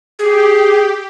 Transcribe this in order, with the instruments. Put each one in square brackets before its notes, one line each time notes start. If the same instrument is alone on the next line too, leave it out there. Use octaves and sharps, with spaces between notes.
[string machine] G4 [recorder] G#4